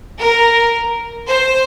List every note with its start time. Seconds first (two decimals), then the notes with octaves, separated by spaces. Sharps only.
0.19 A#4
1.27 C5